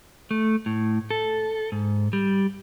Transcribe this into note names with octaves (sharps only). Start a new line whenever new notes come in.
A3
A2
A4
G#2
G3